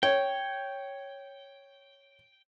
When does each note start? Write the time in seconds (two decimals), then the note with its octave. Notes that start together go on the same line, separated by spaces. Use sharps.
0.03 C#5 G5